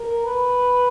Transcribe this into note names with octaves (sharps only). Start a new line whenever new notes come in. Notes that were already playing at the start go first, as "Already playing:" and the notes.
Already playing: A#4
B4